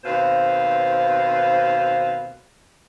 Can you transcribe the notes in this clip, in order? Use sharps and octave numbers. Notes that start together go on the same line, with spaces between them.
D#2 B2 C4 B4 C5 F5